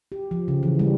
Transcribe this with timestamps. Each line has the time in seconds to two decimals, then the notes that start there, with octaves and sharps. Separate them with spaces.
0.12 G4
0.31 F3
0.48 C#3
0.63 E3
0.79 G3